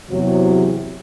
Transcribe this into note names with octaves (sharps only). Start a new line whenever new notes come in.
E2 C3 F#3